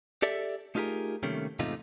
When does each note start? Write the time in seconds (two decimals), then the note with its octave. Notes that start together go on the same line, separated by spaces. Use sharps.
0.22 G4 A4 D5 E5
0.75 A3 D#4 F4 G4 G#4 A#4
1.23 C3 D#3 G3 A3 A#3 C#4
1.59 E2 G#2 C3 A3 D#4 F4